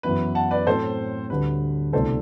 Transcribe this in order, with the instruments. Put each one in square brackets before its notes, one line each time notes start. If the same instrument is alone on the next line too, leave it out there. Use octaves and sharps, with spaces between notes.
[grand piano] F#2 E3 B3 E4 [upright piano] B4
[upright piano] F#5 A5
B4 D5
[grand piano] A2 F#3 C4 [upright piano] A4 C5
[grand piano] D2 D3 G3 [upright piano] B4
[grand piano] C2 B2 A3 D4 [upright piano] A4 C5